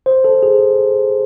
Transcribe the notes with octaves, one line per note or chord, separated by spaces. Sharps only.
C5
A4
G#4